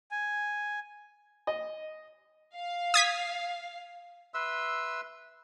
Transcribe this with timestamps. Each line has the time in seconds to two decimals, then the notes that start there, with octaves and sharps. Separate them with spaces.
0.11 G#5
1.47 D#5
2.54 F5
2.94 D#6 G#6 B6
4.34 B4 E5 C6 E6